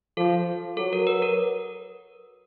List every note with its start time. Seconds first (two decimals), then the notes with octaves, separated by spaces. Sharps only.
0.17 F3 A4
0.77 F#3 A4
0.93 A#4
1.07 B4
1.22 A#4